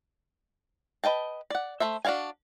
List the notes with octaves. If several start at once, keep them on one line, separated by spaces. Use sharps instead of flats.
B4 D#5 G5 A5
D5 F#5
A3 A4 C5 E5
D4 F#4 D5 F5 G#5